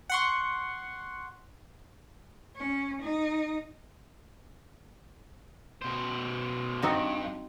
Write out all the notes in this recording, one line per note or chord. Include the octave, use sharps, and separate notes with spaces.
F#5 C6 C#6
C#4
D#4
B2 C5
G2 C4 D#4 F#4